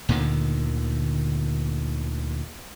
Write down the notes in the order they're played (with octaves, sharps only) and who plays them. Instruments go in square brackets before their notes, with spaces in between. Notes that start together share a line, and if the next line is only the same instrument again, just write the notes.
[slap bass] D2 A#2 D3 D#3